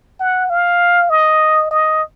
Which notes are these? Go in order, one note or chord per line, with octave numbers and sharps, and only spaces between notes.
F#5
F5
D#5
D#5